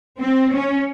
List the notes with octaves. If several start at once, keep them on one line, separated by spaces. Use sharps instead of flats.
C4
C#4